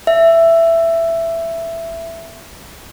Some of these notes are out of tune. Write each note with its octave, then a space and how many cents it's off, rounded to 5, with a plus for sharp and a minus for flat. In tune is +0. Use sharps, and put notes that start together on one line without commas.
E5 +10